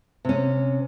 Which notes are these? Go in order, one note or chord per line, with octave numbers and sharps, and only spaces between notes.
C3 C#4